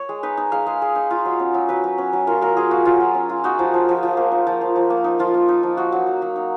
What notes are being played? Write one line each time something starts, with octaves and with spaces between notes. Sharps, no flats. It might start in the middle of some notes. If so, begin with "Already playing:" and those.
Already playing: C#5
G#3
D#4 B4
D#4
G#3 F5
G#3
G#3
D#4
F4
F#3
C#4
F#3
F#3 B4
F#3
C#4
F#3
F4 A#4
F#3 A#4
F4 G#4
F4 F#4
F#3 F4
F#3
C#4
F4
D#4 F#4
F3
F3
F3
F3
A#3
D#4
F3
F3
F3
A#3
D#4
F3 F4
A#3
D#4
F3
D#4 F#4
F#3
F#3
F#3
D#4